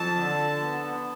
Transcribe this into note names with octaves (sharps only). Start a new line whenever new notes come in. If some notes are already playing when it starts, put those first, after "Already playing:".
Already playing: F2 A5
D3
B3